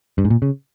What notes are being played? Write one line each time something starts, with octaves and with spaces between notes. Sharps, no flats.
G2
G#2
A#2
C#3